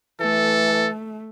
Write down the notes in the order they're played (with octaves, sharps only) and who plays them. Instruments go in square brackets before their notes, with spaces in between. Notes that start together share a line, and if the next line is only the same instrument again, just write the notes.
[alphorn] E3 [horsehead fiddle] A3 [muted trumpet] A4